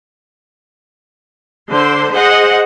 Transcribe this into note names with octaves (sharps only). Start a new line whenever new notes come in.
D3 C5 C6
G#4 C5 D#5 F#5